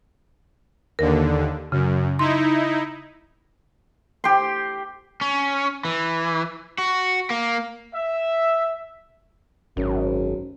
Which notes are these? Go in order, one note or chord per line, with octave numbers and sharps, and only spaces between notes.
D#2 D3 A#4
F#2 C#3
D#4 E4 C6
G4 C6
C#4
E3
F#4
A#3
E5
G#1 F#2